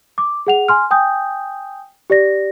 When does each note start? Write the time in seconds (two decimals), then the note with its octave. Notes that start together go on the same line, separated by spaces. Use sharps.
0.18 D6
0.47 G#4 F#5 F7
0.68 G#5 C6 F6
0.91 G5 G#5 D#6 G6
2.10 G4 D5 A#6